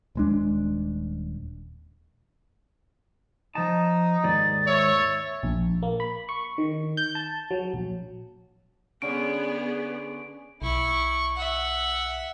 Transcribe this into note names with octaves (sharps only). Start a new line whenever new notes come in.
D#1 G#3 D4
F3 D#4 A5
D#2 G#2 D5 A6
C#5 E5 A6
A#1
A#3
B5
C#6
D#3
G6
A5
F#3
A#1
D3 B3 C#4 G#4 D7
B1 E4 C#6
E5 F#5